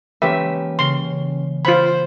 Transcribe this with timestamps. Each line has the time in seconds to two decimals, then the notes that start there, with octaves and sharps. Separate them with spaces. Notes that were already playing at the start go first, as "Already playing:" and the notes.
0.22 E3 G#3 A#3 C#4 G4 B4 E5
0.79 C#3 C6
1.65 F4 C5 B5